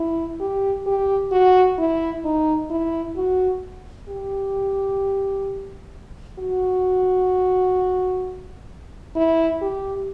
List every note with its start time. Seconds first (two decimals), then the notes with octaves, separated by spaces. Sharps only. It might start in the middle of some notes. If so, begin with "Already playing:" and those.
Already playing: E4
0.40 G4
0.86 G4
1.32 F#4
1.78 E4
2.24 D#4
2.70 E4
3.16 F#4
4.09 G4
6.39 F#4
9.16 E4
9.62 G4